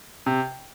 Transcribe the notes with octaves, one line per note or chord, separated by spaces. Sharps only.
C3